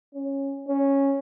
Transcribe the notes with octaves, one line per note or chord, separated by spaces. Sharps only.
C#4
C#4